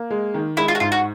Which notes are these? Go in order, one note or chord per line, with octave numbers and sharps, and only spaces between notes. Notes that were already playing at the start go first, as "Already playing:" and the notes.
Already playing: A#3
G#3
D#3
G#3 E4
F4
F#4
G#2 F4
F#4